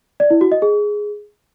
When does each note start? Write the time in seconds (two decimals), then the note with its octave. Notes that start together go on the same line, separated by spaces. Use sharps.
0.20 D5
0.30 E4
0.41 F#4
0.52 D#5
0.62 G#4